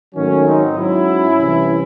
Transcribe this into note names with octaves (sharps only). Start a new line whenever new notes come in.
G#2 D#3 F#3 A3 C#4
C4 D#4
G#2 F#3 C#4 E4
C2 C3 E3